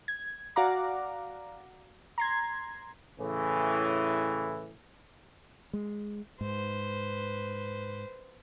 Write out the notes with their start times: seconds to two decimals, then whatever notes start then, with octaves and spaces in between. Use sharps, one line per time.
0.08 G#6
0.56 F#4 D5 F5 F#5 A#5 D6
2.18 A#5 C6 G#6
3.19 A2 C#3 E3
5.73 G#3
6.41 G#2 B4 C5